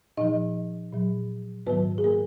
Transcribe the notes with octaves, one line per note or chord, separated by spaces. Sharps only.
A#2 F3 D#4 D#5
A#2 F#3
G#2 D#3 F#3 B3 B4
G#4
A#3 A#4